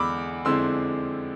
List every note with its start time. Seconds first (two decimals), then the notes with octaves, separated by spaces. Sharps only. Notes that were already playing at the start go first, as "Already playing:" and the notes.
Already playing: E2 D3 G#3 D4 B5 D6 E6
0.45 F2 D3 G#3 C4 E4 C6 E6